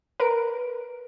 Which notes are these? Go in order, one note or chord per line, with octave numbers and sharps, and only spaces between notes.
A#4 B4 D7